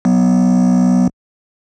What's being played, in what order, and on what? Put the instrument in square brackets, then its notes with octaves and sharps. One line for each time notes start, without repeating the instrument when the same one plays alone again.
[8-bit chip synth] F#3 B3